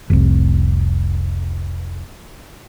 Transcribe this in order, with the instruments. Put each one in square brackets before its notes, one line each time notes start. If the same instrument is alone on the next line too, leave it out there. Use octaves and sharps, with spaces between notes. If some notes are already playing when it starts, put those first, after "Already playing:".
[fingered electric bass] F1 C2